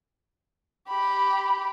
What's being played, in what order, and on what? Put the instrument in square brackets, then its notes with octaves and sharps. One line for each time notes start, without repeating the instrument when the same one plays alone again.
[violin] G4 B5